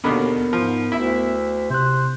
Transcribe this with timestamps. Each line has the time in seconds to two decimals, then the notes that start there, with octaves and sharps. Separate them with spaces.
0.04 D#2 B2 D3 D#3 B3 A#4 B5
0.53 G#2 F3
0.92 D2 E4 E5
1.70 C3 C5 F#6